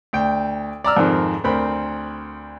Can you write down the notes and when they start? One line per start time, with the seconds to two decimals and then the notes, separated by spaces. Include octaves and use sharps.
0.13 D2 G5
0.84 D5 A#5 E6 F6
0.97 F2 G#2 D#3 C4
1.44 D2 C4 A#4 B5